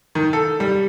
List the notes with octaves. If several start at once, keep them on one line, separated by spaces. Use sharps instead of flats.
D#3
A4
G3